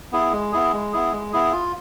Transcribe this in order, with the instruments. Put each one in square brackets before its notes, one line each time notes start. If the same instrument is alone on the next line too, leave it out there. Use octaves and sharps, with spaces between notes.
[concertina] B3 E4 G#4
G#3
B3 E4 G#4
G#3
B3 E4 G#4
G#3
B3 E4 G#4
F4